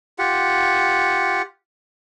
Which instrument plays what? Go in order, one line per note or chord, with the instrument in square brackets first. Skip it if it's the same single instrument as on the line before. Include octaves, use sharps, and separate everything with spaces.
[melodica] F4 G4 F#5